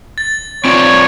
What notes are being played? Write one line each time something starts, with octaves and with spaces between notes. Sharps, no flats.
A6
C4 F4 C#5 D5